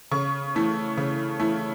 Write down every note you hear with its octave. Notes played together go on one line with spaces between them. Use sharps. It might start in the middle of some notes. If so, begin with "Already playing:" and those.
C#3 C#6
E3 A3 E4
C#3
E3 A3 E4